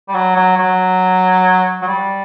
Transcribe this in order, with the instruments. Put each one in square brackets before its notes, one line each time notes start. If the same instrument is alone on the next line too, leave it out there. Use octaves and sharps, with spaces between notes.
[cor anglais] G3
F#3
F#3
F#3
F#3
G3